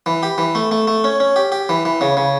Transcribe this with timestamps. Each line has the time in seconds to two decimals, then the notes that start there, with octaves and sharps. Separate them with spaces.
0.06 E3
0.23 G4
0.38 E3
0.55 A3
0.71 A3
0.87 A3
1.04 C#4
1.20 C#4
1.36 G4
1.52 G4
1.69 E3
1.85 E3
2.01 C#3
2.17 C#3